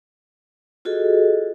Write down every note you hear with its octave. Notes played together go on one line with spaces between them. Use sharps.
F4 F#4 G#4 A4 D#5